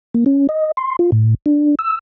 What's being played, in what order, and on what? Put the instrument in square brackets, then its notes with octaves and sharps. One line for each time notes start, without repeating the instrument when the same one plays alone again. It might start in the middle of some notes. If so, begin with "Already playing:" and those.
[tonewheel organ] A#3
C#4
D#5
C6
F4
A2
D4
E6